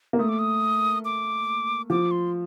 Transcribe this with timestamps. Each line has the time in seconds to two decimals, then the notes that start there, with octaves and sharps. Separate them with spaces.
0.13 A#3
0.19 A3 D#6
0.29 D6
0.39 D#6
1.05 D6
1.90 F3 D6
2.11 C6